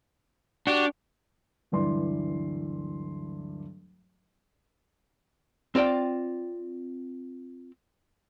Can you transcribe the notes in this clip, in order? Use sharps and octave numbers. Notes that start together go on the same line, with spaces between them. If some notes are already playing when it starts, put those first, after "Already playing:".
D4 F#4 G4
D1 G2 E3 D5 C6
C4 F4 D5 G5